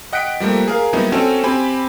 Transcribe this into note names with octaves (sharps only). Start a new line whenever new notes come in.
D#5 F#5 G5 F#6 B6 D7
F3 G3 A3 A#3
G#4 A#4 F5
F#3 G3 A#3 B3 D#4 E4
C4 C#4 F#4 A4 G5 G#5
C4 G4 G5 G#5 B5